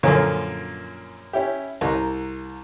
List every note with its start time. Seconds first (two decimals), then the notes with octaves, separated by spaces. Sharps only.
0.03 F#2 A#2 D3 F3 A#3 C#4
1.33 C#4 E4 G4
1.81 C2 A#5